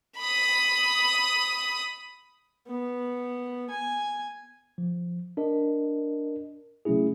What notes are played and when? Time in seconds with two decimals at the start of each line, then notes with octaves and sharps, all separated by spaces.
0.19 B5 D#6
2.68 B3
3.70 G#5
4.78 F3
5.37 D4 A#4 D#5
6.85 C3 F#3 A3 C#4 E4 G#4